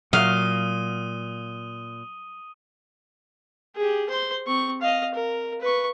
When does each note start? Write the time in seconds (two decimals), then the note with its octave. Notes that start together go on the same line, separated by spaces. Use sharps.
0.13 A#2 F#3 F5 F#5 D#6 D#7 G7
3.76 G4 G#4
4.09 C5 C6
4.46 C4 C#6
4.81 D#5 F5
5.14 A#4
5.61 B4 C#6